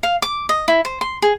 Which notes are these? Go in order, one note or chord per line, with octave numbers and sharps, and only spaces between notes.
F5
D6
D#5
E4
C5
C6
G#4